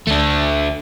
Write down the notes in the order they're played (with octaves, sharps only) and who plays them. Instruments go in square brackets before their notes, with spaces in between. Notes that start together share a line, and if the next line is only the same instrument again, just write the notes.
[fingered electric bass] D2 [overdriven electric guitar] A3 D4